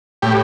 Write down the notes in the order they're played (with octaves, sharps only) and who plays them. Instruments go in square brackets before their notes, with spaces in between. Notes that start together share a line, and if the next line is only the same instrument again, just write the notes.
[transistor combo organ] A2 G4